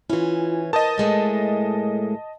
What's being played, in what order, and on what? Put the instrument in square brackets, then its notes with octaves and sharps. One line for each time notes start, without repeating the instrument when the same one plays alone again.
[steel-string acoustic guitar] E3 C#4 [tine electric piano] E4 F4
[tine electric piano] A#4 D#6 A6 [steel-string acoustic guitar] C5 [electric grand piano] D#5 A5
[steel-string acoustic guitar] A2 G#3 A3